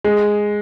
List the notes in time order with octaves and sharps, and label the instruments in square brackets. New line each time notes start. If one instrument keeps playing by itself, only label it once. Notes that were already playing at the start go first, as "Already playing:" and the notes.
[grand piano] G#3